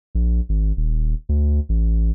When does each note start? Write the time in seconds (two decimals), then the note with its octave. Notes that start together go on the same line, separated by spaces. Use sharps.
0.15 A#1
0.49 G#1
0.77 D#1
1.29 D2
1.69 A1